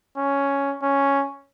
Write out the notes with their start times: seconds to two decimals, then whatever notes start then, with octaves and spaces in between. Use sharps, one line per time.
0.17 C#4
0.82 C#4